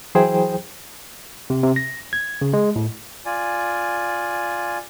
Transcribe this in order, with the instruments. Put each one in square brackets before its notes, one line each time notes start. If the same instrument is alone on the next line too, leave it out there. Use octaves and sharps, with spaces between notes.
[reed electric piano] E3 F#3 E4 G#4 C5 G5
[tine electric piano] C3
C3
A#6
G#6
C#3
G#3
A2
[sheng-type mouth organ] F4 D5 G#5